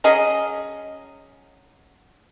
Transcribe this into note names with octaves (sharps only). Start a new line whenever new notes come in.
F#3 C#4 G#4 D#5